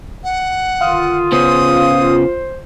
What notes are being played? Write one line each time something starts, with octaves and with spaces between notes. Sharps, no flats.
F#5
D3 D#3 F4 D#6
C#3 B3 C#4 C5 D#6